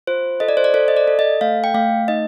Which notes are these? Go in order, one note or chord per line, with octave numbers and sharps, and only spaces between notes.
F4 C5
A4 D#5
D5
C5
D5
A4 C5
D#5
D5
A4
D#5
A3 F5
G5
A3 F5
D#4 D#5